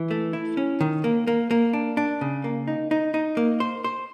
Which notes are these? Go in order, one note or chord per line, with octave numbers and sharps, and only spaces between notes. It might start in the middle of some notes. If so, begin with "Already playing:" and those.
Already playing: E3
A3
E4
C#4
D#3
A#3
A#3
A#3
D4
D4
C#3
A#3
D#4
D#4
D#4
A#3
C5
C5